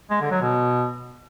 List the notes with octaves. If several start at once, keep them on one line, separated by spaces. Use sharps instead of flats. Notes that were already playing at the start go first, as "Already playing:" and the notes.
G#3
D3
F#3
B2